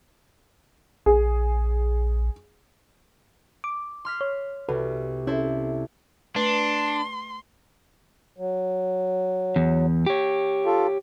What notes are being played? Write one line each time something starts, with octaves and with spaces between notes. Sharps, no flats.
A#1 G#4
D6
C6 F6 B6
C#5
C2 F#4 A4 B4
C#4 E4 A4 C5
A3 D4 B4 C6
F#3
E2
G4 C#5
F4 A4